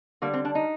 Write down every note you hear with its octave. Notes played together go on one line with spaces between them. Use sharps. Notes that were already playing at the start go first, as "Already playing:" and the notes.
D3 G3 A#3
C4
D4
D#4